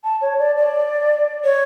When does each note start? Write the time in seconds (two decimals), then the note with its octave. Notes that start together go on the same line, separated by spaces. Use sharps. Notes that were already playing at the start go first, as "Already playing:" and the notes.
0.04 A5
0.21 C#5
0.39 D5
0.57 D5
1.44 C#5